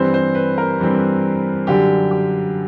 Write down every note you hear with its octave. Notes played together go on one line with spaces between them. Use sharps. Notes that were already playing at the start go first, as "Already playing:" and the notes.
Already playing: G2 E3 G3 C4 C5
C5
B4
A#4
G2 E3 G3 C4
F#2 D3 G3 G4
G4